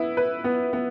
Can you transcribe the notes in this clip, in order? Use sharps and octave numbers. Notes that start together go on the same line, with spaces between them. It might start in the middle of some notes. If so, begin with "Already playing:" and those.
Already playing: B3 E4
B4
B3
B3